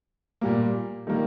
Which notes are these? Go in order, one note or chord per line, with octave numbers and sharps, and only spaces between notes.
A#2 G3 A#3
D#3 G3 A#3